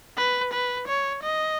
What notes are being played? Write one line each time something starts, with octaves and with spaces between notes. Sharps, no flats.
B4
B4
C#5
D#5